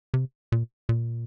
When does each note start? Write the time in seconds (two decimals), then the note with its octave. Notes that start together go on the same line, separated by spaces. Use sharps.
0.14 C3
0.52 A#2
0.89 A#2